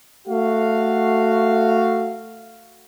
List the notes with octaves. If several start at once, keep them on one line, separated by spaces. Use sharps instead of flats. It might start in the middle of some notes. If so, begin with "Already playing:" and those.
A3 F#4 F5